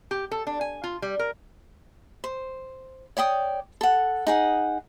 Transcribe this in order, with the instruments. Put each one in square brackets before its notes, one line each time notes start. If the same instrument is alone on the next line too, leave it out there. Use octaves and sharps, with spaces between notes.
[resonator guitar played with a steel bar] G4
A4
D4
G#5
F4
G3
A#4
[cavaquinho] C5
C#5 D5 G5 D#6
A4 F#5
D#4 G#4 F#5